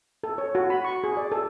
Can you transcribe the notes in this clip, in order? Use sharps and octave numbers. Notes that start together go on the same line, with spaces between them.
A4
C#5
F#4
B5
C#6
G#4
D5
A4